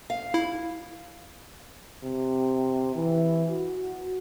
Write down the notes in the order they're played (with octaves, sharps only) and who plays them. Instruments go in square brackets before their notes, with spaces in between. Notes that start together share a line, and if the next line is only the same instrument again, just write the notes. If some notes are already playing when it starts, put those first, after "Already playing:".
[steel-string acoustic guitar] F5
[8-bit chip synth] E4
[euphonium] C3
E3
F#4